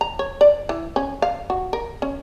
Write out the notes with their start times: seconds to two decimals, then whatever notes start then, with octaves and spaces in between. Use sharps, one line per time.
0.01 A#5
0.19 C#5
0.41 D5
0.69 E3
0.96 C#4
1.22 F5
1.50 F#4
1.73 A#4
2.02 C#4